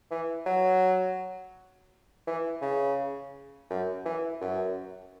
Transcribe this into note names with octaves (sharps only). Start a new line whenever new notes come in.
E3
F#3
E3
C#3
F#2
E3
F#2